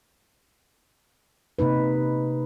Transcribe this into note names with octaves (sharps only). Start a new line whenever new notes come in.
C3 A#3 D#4 B4